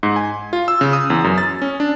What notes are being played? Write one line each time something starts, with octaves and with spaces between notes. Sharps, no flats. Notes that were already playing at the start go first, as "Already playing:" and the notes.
G#2
G#5
F4
E6
C#3
D#6
E2
F#2
A6
C#4
D4